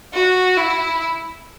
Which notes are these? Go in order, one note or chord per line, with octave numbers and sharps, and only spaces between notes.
F#4
E4